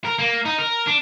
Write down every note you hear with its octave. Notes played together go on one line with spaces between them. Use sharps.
A#4
A#3
D#4
A#4
D4